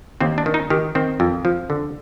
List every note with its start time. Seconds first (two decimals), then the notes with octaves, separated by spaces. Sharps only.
0.21 D#2 C4
0.38 D4
0.46 D#3
0.54 D#4
0.70 D#3 G4
0.95 D#3 C4
1.20 F2
1.45 F3
1.70 D3